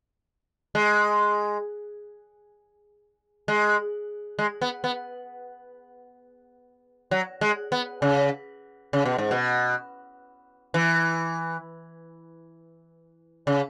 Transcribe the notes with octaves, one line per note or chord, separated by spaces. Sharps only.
G#3
G#3
G#3
B3
B3
F#3
G#3
B3
C#3
C#3
B2
G#2
B2
E3
C#3